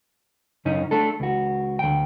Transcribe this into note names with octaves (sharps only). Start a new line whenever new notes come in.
F#2 C#3 C#4 D#4
A3 D4 A4
C#2 F#4
D2 G5